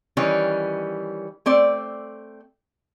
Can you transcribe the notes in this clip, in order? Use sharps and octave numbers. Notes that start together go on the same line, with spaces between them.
D#3 E3 G3 C#4
A3 C4 D5